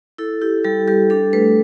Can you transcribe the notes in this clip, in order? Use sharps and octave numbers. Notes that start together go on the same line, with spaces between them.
E4 A4
E4 G4
G3 A4
G3 G4
D4 A4
A3 B4